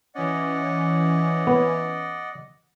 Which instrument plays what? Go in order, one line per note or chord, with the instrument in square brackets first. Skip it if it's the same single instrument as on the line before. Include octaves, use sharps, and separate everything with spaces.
[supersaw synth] E3 C#4 [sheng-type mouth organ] D5 D#5 F#5
[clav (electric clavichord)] B3